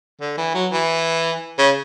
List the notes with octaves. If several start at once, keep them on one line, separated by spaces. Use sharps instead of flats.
D3
E3
F#3
E3
C#3